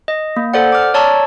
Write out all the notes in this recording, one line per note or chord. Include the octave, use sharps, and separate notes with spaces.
D#5
A#3
A4 C5 D5 F#5
D6 F6
C#5 D5 A5 A#5 C#6 E6